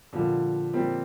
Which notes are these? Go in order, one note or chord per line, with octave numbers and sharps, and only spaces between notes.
A#2 D3 F3 G3 A#3 F4
A#2 F3 G3 A#3 C4 F4